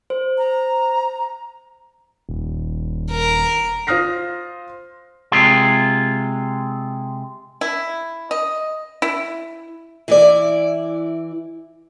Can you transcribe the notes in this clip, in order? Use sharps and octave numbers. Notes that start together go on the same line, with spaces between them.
C5
A#5
D#1
A#4
F4 C5 D#6 F6 A#6 C7
C3 G#3 F4
E4
D#5
E4
E3 E4 D5